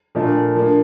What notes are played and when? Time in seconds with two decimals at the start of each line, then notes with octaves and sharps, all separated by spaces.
0.15 A#2 F3 A3 D4
0.55 F3 A#3 D4